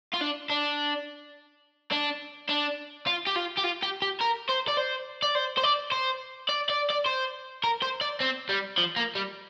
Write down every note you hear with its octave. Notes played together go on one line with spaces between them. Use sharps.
F4
D4
D4
D4
D4
F4
G4
F4
G4
F4
G4
G4
A#4
C5
D5
C5
D5
C5
C5
D5
C5
D5
D5
D5
C5
A#4
C5
D5
C4
G3
F3
A#3
G3